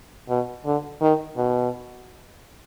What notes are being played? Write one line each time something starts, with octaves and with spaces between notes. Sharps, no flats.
B2
D3
D#3
B2